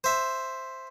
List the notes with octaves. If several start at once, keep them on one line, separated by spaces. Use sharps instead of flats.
C5 E5